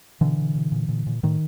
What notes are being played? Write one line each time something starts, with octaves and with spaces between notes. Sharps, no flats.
B2 D3 E3
B2
B2
A#2
A#2
A#2
A2 D#3